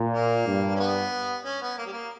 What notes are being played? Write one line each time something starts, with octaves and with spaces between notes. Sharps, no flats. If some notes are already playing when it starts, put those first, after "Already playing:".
Already playing: A#2
A#3
G2
C#4
B3
C#4
B3
A#3
G3
A#3